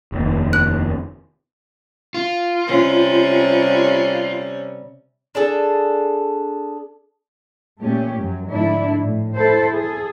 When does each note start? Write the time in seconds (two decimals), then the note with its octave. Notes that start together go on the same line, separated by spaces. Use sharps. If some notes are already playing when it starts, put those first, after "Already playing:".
0.12 F1 D#2
0.53 F#6
2.14 F4
2.67 C3 G3 C#4
5.35 D4 G#4 A4
7.81 A#2 A3 C#4 G4
8.18 F#2 F#3
8.48 G#2 D3 F3 A3 D4 E4
9.03 A2
9.35 E4 A4 C5
9.76 G#4 A4